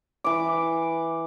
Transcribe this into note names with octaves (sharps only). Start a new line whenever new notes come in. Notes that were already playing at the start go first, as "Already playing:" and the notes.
E3 D6